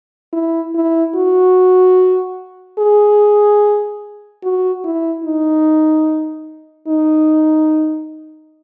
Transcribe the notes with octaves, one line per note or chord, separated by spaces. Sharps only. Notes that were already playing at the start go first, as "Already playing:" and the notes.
E4
E4
F#4
G#4
F#4
E4
D#4
D#4